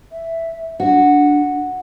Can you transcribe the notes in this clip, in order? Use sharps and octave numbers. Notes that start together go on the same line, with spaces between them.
E5
D4 F#4